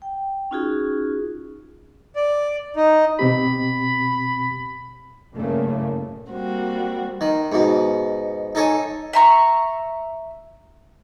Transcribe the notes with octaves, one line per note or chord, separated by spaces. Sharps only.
G5
C#4 D#4 F4 F#4 G#4
D5
D#4
B2 C4 G4 B5
F#1 G2 A#2 C#3 A3 A#3
G3 A#3 C4 F#4
D#3
G#2 B2
D#4 A4 C#5 G#5
E5 A#5 C6 C#6